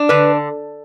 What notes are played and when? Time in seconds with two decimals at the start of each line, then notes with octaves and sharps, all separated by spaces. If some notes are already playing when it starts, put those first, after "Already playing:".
Already playing: D4
0.09 D3 B4